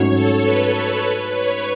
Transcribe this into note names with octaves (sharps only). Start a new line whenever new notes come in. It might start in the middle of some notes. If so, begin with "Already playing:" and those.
Already playing: G#2 F#3 A3 C#4 F#4 C#5
A4
B4
A4
B4
C#5